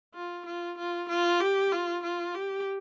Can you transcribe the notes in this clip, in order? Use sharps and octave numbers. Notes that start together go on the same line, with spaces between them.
F4
F4
F4
F4
G4
F4
F4
G4